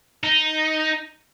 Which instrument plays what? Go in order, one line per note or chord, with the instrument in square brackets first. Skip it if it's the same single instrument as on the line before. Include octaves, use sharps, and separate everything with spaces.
[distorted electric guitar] D#4